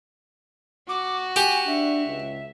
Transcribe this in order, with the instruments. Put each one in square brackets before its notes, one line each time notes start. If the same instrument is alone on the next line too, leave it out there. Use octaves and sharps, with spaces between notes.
[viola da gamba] F#4 [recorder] D6
[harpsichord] G4 [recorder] G#5
[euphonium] D4 [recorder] E5
[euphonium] C#2